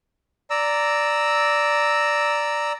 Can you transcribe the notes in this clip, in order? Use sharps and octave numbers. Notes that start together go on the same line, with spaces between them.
D5 A#5 E6